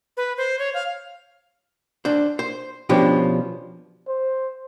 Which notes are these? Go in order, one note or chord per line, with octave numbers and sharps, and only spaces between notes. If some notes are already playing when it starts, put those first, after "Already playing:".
B4
C5
C#5
F5
D4 C5
C5
B2 F3 C#4 D4 G4
C5